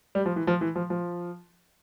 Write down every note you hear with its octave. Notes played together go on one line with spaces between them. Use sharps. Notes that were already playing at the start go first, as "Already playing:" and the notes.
G3
F3
E3
F3
E3
F3
F3